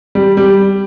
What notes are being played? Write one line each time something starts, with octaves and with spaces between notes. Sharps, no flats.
G3
G3